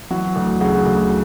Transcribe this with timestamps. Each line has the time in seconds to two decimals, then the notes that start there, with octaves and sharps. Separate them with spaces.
0.10 E3 F#3 F#4
0.36 D2
0.61 C#3 F#3 F#4
0.86 D2